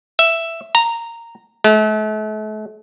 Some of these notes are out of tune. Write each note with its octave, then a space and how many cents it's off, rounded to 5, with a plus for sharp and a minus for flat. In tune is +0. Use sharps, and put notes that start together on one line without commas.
E5 +5
A#5 -10
A3 -40